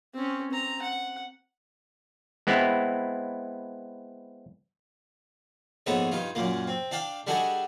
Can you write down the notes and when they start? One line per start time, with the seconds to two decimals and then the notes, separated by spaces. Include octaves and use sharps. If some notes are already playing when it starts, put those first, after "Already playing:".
0.14 C4 C#4
0.51 C4 A#5
0.82 F#5
2.47 G#3 B3 C4 E4
5.86 A#1 G#2 B3 D#4 A4 C#5
6.12 G2 D#4 F4
6.35 F#2 A#2 A#3
6.68 C4
6.91 D4 D5 F5 G5
7.27 G3 D4 F#4 G#4 A4 D#5